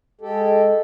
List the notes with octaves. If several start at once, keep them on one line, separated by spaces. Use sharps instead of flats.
G#3 G4 A4